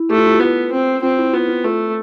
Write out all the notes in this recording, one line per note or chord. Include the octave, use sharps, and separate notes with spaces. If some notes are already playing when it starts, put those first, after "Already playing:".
Already playing: E4
A3 G4
F4
E4
F4
B3
C4
C4 F4
E4
B3 F4
F4
A3 F4